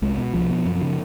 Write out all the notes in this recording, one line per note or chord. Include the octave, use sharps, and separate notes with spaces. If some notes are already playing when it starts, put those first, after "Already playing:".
C2 G#3
B2
C2 F3
B2
F#2
C#3